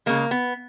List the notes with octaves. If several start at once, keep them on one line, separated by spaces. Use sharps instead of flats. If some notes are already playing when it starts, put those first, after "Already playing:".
C#3 G#3 A#3
B3